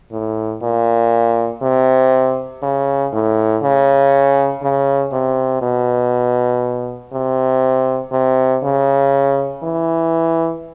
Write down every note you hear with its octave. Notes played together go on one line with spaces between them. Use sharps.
A2
A#2
C3
C#3
A2
C#3
C#3
C3
B2
C3
C3
C#3
E3